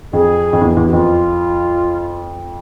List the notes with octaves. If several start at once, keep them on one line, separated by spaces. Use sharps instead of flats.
F2 G#4
F2
E2
E2
G4
F2 F4